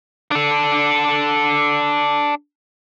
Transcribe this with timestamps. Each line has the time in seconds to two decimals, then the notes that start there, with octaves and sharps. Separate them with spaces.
0.32 D4 A4